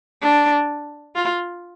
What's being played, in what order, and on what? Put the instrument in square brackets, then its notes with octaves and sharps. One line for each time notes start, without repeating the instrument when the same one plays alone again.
[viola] D4
F4